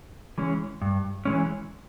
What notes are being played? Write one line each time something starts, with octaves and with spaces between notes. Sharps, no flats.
E3 G#3 C#4
G2
E3 G#3 C#4